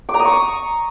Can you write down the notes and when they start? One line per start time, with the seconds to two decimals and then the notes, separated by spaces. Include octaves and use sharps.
0.09 D6
0.14 A#5
0.20 D#6
0.25 C#6